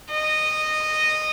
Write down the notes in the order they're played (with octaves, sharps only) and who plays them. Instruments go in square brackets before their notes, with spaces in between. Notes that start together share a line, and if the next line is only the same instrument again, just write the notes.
[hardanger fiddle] D#5